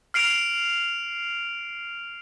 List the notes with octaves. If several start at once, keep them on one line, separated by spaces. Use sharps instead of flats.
F6 C7 D7 F7